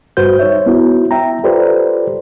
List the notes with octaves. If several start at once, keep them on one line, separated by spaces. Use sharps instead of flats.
G2 F#4 B4 C5 G6
D#4 C#5 E5
B3 E4 F#4
E5 G5 A#5
F4 G4 A4 B4 C5 D5